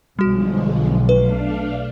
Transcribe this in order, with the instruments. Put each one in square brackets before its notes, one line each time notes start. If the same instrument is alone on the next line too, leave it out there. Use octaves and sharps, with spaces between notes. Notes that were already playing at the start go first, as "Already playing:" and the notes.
[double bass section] B1 [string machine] D3 F3 G#3 [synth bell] G3 F#4
[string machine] A3 D4 F5 [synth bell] B4